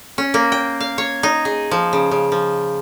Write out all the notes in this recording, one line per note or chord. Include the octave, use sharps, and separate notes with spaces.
C#4
A#3
G5
F5
C#5
D#4
G#4
F3
C#3
C#3
F3